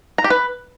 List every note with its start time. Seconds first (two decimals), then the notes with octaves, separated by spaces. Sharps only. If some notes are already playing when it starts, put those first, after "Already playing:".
0.18 A#5
0.24 G4
0.30 B4